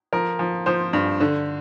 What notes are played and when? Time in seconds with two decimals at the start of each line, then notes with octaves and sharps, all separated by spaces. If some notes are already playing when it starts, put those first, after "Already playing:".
0.13 F3 A#4
0.39 F3
0.66 F3 C5
0.93 G2
1.20 D3